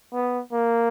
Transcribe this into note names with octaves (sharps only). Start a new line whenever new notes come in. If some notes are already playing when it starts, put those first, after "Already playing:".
B3
A#3